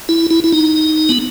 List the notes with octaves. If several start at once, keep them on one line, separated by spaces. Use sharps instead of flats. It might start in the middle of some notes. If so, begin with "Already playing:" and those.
E4
E4
E4
D#4
B3